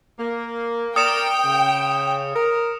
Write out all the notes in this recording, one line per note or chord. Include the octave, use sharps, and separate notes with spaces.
A#3
A#4 D5 G5 D#6 C#7 E7
C#3
A#4